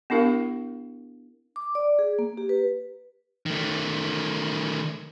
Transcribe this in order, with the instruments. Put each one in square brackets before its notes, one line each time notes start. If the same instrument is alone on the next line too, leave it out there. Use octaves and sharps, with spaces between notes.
[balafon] B3 D4 E4 G4 A#4 F5
[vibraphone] D6
D5
G#4
A#3
G4
B4
[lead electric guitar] D#3 A3